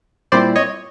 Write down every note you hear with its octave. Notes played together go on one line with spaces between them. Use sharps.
A#2 G3 C4 E4 C5 D5
C#5 D#5